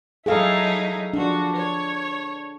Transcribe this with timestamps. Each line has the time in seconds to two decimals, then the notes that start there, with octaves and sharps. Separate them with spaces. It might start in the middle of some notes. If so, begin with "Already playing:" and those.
0.26 F#3 D#4 E4 G#4 A4 F5
1.13 F3 D4 F#4
1.56 C#5